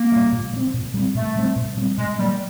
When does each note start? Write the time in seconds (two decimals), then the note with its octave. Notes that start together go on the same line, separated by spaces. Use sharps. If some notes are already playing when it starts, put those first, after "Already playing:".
Already playing: A#3
0.12 A#2 G3
0.32 A#2
0.53 G3
0.56 C4
0.74 A#2
0.94 G3 C4
1.15 A#2 A3
1.36 G3 C4
1.56 A#2
1.77 G3 C4
1.98 A#2 G#3
2.18 F#3 G3 A#3